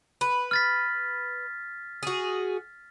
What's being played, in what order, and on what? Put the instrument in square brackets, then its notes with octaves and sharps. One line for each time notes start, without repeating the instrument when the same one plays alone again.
[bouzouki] B4
[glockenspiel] F6 A6 B6
[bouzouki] F#4 G#4